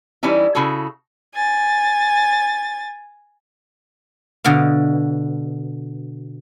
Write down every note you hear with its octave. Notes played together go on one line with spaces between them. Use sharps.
E3 G3 C#4 D#4 E4
C#3 E4 F#4 G#4 A4
G#5 A6
B2 D3 D#5 F5